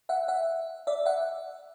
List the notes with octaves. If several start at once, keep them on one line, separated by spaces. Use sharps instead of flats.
E5 F#5
E5 F#5
D5 E5
E5 F#5